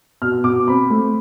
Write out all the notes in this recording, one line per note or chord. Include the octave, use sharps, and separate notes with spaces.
B2 F6
B2 D6
C4 B5
A3